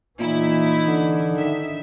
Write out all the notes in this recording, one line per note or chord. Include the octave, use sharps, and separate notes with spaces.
A#2 E3 D#4 E4
D3
D#3 E5